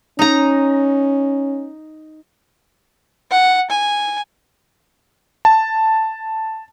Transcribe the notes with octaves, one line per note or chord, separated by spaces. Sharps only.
C#4 D#4 A#5
F#5
G#5
A5